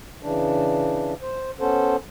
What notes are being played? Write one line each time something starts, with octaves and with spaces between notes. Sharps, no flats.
C#3 E3 D4
C5
B3 C#4 A4 C5